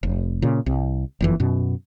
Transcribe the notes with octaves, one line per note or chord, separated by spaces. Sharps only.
F1
A#2 C#3
C2
F#1 F2 E3
F#2 B2